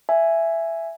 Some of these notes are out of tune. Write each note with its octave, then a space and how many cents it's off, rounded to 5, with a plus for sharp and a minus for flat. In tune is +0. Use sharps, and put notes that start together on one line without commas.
E5 +10 G#5 +0